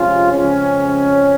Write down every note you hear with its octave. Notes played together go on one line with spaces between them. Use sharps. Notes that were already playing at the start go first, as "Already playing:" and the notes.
Already playing: C3 F3 G#3 C4 C#4 F4
F2 C#3 G#3 C4 C#4